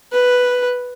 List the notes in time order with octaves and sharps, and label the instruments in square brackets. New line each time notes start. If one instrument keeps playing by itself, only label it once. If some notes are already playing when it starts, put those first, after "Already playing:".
[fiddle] B4